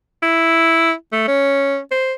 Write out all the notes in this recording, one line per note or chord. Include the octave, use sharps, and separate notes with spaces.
E4
A3
C#4
C5